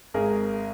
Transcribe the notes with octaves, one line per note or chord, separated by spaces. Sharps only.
G#1 G#4 A#4